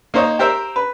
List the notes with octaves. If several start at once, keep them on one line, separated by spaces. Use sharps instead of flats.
A#3 D#4 C5 C#5 D#5
G4 A#4 C5 E5
B4